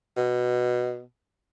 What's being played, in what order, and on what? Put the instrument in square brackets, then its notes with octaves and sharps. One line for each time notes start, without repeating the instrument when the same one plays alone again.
[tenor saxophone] B2